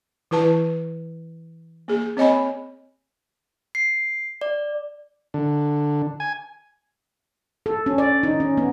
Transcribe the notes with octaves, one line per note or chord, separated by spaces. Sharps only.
E3 E4 B4 A5
A#3 G#4
C4 C#5 D#5 G#5 B5
C7
D5
D3
G#5
A4
C#4
D5
D#4
C#4
B3